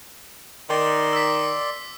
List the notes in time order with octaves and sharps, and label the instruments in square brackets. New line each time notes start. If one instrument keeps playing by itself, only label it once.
[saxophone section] D#3 [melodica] D5 C6
[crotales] E6 B6